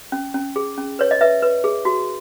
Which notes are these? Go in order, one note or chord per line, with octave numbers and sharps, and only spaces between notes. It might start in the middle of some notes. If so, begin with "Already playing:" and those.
C#4
C#4
G#4
C#4
B4 C#5
D#5
B4 E5
B4
G#4
F#4